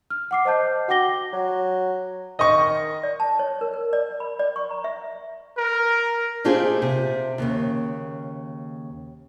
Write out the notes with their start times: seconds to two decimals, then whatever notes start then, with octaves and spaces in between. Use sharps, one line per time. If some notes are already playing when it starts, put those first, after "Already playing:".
0.10 F6
0.31 F#5 D6 C7
0.45 C5 D#5 A5 G6
0.88 F#4 F#5 G5 D6 A#6 G7
1.33 F#3
2.39 D#3 D#5 C#6
3.03 D5
3.20 A5
3.39 C#5
3.61 A#4
3.74 A#4
3.93 D5
4.20 B5
4.39 D5
4.56 C#6
4.71 A#5
4.84 E5
5.58 A#4
6.44 A3 C4 D#4 F4 G4 G#4
6.82 C3
7.38 D#2 A#2 C#3